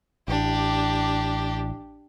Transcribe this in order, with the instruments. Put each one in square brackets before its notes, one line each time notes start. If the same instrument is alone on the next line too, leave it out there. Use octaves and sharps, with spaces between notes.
[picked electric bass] A1 [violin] D4 G4